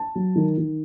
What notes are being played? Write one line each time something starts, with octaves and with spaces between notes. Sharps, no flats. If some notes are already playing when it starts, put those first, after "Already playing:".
Already playing: A5
F#3
D#3
D#3